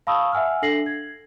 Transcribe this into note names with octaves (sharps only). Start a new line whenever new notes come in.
F5 A5 B5 C#6 D#6 E6
E5 F#5 G#5 E6 F6
D4 A4 A#6 C7 F#7
G#6